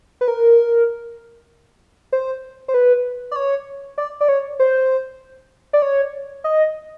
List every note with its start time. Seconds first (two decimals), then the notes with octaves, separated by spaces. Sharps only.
0.21 B4
0.28 A#4
2.13 C5
2.68 C5
2.74 B4
3.31 D5
3.36 C#5
3.98 D5
4.21 D5
4.28 C#5
4.59 C5
5.73 D5
5.82 C#5
6.44 D#5